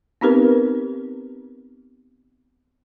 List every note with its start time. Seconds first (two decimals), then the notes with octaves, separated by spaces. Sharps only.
0.21 B3 C4 D#4 G4 A#4 B4